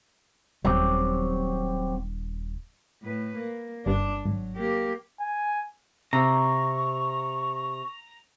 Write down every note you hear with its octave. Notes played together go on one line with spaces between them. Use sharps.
D#1 F#3 C4 G4
A2 B4
A#3
G1 G2 D4
G#1 F#3
A#3 G4
G#5
C3 A#5 C#6